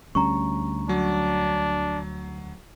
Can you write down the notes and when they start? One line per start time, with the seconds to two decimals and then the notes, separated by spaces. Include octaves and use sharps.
0.15 D2 G3 C#4 A#5 C#6
0.89 F#3 D4